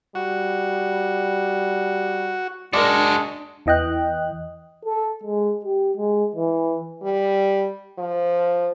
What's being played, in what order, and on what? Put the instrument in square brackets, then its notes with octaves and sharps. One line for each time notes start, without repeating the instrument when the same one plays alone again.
[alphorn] G3 [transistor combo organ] F#4
[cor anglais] G#3 [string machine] D4 [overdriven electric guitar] F#4 A4 [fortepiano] A#4 D5
[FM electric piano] E2 E3 D#5 G5 F#6
[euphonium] A4
G#3
G4
G#3
E3
[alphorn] G3
F3